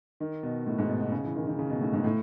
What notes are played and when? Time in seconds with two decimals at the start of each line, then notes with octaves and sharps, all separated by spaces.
0.20 D#3
0.43 B2
0.67 A2
0.78 G#2
0.89 B2
1.00 B2
1.12 C#3
1.24 E3
1.36 D#3
1.47 D#3
1.59 C#3
1.70 B2
1.81 A2
1.93 G#2
2.04 A2